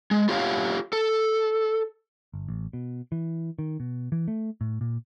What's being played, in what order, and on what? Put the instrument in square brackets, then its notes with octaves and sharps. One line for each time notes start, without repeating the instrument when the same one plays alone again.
[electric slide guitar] G#3
F4 G4 C#5 F5
A4
[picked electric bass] G1
A1
B2
E3
D#3
B2
E3
A3
A2
A#2